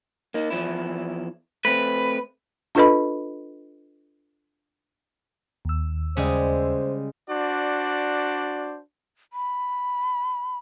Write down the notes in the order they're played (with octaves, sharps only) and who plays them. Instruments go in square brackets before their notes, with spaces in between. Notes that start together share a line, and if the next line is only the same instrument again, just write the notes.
[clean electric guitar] A#3 D#4
E2 F3 E4
[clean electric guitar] A3 C4 [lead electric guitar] B4
[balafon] D4 F4 A4 B4 D#5 B5
[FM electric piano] D#2 E6
[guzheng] C#3 G3 G#3 [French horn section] C5
[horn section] D4 F#4 C5 D5
[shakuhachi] B5